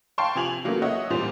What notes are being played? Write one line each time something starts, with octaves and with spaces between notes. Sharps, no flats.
F5 G5 A5 C6 C#6
C3 F3 G#5 F7 F#7
C#3 E3 F#3 A3 A#3
C#5 D#5 E5 F#5
E2 A#2 G3 C5 F7